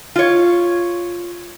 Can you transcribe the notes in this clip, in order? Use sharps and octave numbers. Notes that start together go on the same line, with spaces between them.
F4 C#5